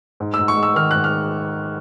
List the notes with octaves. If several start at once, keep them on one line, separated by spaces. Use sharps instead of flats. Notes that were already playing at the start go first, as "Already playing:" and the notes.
G#2
E6
G#2
C#6
G#3
E6
D#3 F6
G#2 F#6
F6